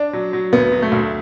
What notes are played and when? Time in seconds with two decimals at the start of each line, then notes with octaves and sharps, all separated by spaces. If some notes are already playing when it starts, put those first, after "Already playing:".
Already playing: D4
0.13 F#3
0.33 F#3
0.53 D2 B3
0.72 F#3
0.82 A3
0.92 D2